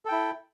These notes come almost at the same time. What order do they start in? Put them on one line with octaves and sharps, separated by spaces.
A4 G5 E4